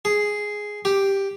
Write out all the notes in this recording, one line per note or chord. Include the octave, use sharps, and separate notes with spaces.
G#4
G4